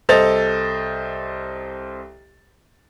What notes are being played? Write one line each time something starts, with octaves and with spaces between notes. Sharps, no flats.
C2 A4 C5 D#5 A6 F7